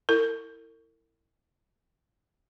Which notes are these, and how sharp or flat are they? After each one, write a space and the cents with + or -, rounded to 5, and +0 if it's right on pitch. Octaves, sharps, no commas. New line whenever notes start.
E4 +0 A#4 -45